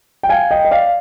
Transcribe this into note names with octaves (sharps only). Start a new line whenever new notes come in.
G5
F5 G#5
D#5 G5
D#5
D5 F5